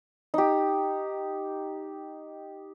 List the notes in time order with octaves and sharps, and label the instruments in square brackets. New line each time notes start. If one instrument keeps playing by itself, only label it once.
[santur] D#4 G4